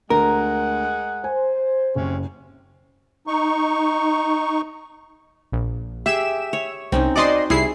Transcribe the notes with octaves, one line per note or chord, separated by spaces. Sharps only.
D2 G#3 A#4 F#5
C5 G#5
F#1 C3 C#4
D#4 C#6
A#1
G4 G#4 E5 E7
C#5
C2 C4 C#4 D#4
F#4 C5 D5 D#5 C6
C2 E4 G#4 C7